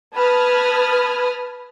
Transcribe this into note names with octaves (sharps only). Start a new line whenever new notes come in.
B4 A5 B5 D#6 F6 G#6